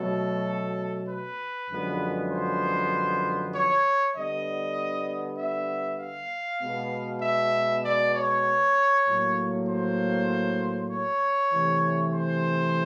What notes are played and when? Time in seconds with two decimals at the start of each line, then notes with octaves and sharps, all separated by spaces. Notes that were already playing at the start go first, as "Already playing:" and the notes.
Already playing: B2 F#3 A3 A4
1.08 B4
1.70 F#2 D3 F3 G#3 B3
2.32 C5
3.54 C#5
4.15 D3 G3 B3 D#5
5.38 E5
6.00 F5
6.61 B2 G#3 B3
7.22 E5
7.85 D5
8.14 C#5
9.06 A2 F#3 A#3
9.69 C5
10.91 C#5
11.52 C3 E3 A3
12.14 C5